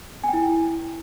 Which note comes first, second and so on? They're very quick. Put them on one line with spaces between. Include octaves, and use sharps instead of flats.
G#5 G5 E4